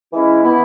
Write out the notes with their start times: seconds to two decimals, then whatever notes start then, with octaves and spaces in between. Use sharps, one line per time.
0.12 E3 G#3 C#4 E4
0.43 E3 B3 E4